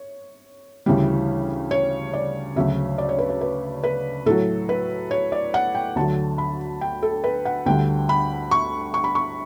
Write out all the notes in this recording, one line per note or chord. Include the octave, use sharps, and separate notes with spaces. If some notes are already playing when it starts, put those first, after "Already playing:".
Already playing: C#5
D2 C#3 E3 G3
C#5
D5
D2 C#3 F#3 E5
D5
C#5
B4
C#5
B4
B4
A2 F#3 A4
B4
C#5
D5
F#5
G5
D2 D3 F#3 A5
B5
G5
A4
B4
F#5
D2 D3 G3 G5
B5
C#6
C#6
B5
C#6